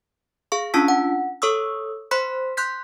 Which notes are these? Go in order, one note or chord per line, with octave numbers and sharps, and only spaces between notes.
G#4 F5 C#6
C#4 D4 F4 A5 E6 B6
F#5
A4 C#5 C#6 D#6 E6
C5 B5 C6 F#6 B6
C6 F#6 G6 B6